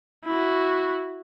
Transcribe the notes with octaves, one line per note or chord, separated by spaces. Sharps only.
E4 F#4